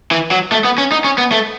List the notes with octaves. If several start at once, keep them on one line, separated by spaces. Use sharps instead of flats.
E3
F#3
A3
B3
C#4
D#4
C#4
B3
A3